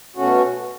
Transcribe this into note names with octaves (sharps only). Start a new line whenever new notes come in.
B2 A3 C#4 F#4